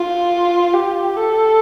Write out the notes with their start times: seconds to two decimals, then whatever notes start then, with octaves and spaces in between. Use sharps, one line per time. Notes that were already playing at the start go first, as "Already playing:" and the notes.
Already playing: F4
0.74 G4
1.17 A4